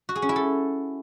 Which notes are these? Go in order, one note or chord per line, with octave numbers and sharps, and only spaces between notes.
F#4
G#4
C#4
E4
A4